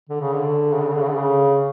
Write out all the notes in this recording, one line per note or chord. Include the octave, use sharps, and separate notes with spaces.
D3
C#3
D3
C#3
D3
C#3
D3
C#3
D3
C#3